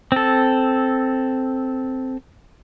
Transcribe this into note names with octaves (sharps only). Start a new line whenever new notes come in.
C4 A4